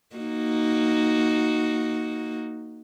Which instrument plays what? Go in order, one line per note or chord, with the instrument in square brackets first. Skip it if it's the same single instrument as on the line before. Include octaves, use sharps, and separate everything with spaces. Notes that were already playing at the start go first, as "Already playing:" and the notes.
[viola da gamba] A#3 D#4 F#4